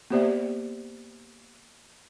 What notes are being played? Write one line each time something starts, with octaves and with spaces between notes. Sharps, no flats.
A#3 B3 G4 C5 D5 E5